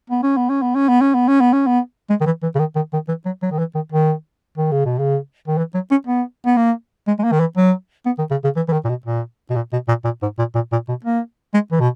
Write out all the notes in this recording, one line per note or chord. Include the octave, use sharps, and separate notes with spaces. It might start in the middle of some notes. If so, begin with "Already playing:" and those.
B3
C#4
B3
C#4
B3
C#4
B3
C#4
B3
C#4
B3
C#4
B3
G#3
D#3
E3
E3
C#3
D#3
D#3
D#3
E3
F#3
F#3
D#3
E3
D#3
D#3
D#3
C#3
B2
C#3
D#3
E3
F#3
C#4
B3
B3
A#3
G#3
G#3
A#3
D#3
E3
F#3
B3
D#3
C#3
C#3
E3
E3
D#3
A#2
B2
A#2
B2
A#2
B2
A#2
A#2
G#2
A#2
A#2
A#2
B2
A#3
G#3
E3
B2